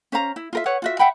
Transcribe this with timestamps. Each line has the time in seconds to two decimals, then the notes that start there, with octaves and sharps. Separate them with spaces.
0.12 C#4 C5 F5 A#5
0.36 E4
0.53 F4 A#4 E5
0.66 B4 C#5 F#5
0.82 F4 F#4 E5
0.99 E5 F#5 G5 B5